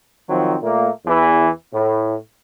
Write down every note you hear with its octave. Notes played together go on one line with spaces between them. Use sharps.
D#3 F3 F#3 C4
A#2 A3 A#3
E2 E3
A2